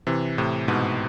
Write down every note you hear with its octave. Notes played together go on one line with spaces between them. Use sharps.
C3 E3
A2 C3
G#2 B2